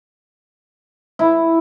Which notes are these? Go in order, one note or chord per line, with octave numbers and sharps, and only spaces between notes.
E4